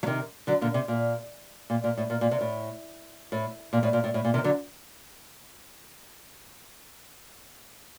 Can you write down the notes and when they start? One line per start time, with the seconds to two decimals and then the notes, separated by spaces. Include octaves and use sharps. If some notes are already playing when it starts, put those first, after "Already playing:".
0.03 F#3
0.06 C3 D#3
0.47 D3 F#3
0.61 A#2 D3
0.74 C3
0.88 A#2
1.70 A#2
1.84 A#2
1.97 A2
2.10 A#2
2.21 A#2
2.31 C3
2.41 A2
3.32 A2
3.73 A#2
3.83 A2
3.93 A#2
4.04 A2
4.14 A2
4.25 A#2
4.34 C3 D#3
4.44 D3 F#3